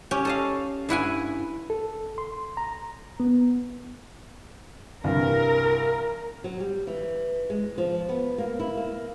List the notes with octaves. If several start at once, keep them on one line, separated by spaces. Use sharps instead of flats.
C#4 G4
A4 D#5 F5
G2 E4 F#5 G#5
A4
C6
A#5
B3
C2 G2 E3 A#4
F#3
G3
E3
G#3
F3
B3
A#3
E4
A#3